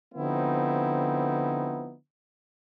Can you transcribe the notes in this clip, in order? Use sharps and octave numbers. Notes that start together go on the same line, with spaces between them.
D3 F3 B3 C4 D#4 E4